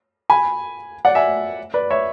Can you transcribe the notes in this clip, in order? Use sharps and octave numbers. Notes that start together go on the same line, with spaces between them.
G#5 B5
D5 F#5
E5 G#5
B4 D5
C#5 E5